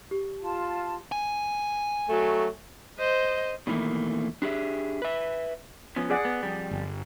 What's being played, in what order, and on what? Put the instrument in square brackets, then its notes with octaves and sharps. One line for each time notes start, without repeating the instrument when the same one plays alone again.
[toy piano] G4
[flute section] F4 A5
[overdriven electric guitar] G#5
[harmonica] F#3 A3
[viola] C5 D#5
[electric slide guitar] B2 D#3 E3 A3 A#3
D4 G4 G#4 E5
B4 E5
F3 B3 C#4
[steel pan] G#4 D5 F#5
[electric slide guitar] B3
F2 G3
[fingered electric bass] G1